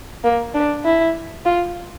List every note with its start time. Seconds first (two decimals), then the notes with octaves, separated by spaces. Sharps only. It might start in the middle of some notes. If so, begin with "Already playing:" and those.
0.24 A#3
0.54 D4
0.85 E4
1.45 F4